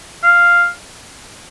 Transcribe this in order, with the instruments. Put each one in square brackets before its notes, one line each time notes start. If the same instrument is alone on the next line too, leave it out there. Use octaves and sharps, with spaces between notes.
[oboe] F5